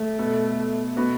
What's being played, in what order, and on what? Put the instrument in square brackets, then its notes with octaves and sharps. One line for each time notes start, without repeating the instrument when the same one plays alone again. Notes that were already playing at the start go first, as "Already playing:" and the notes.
Already playing: [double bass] A3
[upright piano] B2 B3 A4
B2 B3 F#4 B4